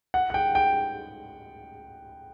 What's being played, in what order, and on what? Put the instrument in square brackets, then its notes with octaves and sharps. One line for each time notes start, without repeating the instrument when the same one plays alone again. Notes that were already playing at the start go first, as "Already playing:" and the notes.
[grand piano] F#5
F#5
G5
G5